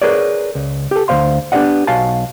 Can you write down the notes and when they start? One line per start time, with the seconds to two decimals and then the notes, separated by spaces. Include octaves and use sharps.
0.02 G#4 A#4 B4 C#5 D5
0.55 C#2
0.91 G4 A4
1.08 D2 B2 C5 F5 C6
1.52 B3 D4 G4 D5 D#5 F#5
1.87 B1 F#4 F5 G#5 A5